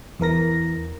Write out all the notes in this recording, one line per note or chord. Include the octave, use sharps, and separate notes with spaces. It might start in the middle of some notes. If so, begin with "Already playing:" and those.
E2 E3 A#4 A#6